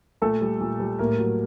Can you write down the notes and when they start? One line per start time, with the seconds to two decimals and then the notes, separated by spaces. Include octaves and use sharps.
0.22 A#2 A3 A4
0.41 G3
0.61 A#2
0.80 G3
0.99 A2 A#3 A#4
1.19 F#3